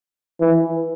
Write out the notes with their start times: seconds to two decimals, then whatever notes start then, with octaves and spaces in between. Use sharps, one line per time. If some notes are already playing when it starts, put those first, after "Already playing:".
0.40 E3